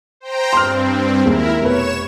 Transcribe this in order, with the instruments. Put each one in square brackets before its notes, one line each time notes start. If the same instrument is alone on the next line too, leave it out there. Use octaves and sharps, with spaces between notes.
[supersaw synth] C5 G5 A#5
[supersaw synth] G2 C4 [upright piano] C6 F6
[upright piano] D#2 G#3 [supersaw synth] E4 A#4
[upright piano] F1 B2 B4 [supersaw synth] C#5 E7